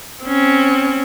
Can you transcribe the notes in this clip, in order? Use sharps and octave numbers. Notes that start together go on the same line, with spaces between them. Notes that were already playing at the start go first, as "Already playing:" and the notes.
C4 C#4